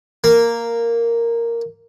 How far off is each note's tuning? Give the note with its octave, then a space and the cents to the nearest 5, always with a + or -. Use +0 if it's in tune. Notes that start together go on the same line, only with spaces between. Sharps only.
A#3 -5